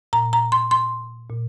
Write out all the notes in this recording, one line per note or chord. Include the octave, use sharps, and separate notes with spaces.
A#2 A#5
A#5
C6
C6
A#2